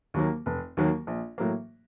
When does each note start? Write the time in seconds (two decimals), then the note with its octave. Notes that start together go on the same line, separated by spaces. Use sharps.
0.14 D#2 D#3 F#3 A#3
0.46 F1
0.77 D#2 D#3 F#3 A#3
1.07 A#1
1.38 A2 F#3 A#3